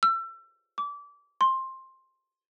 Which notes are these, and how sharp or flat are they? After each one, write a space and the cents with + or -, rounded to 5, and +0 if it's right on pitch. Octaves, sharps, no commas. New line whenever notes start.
E6 +30
D6 -25
C6 +15